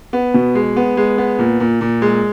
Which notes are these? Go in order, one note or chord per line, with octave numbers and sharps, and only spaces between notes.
B3
B2
G#3
B3
G#3
B3
A#2
A#2
A#2
G#3